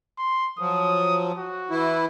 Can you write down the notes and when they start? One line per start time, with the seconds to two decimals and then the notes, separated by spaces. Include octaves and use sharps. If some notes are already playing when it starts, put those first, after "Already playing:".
0.18 C6
0.59 F3 F#3 D#6
1.38 F#4
1.70 E3 E4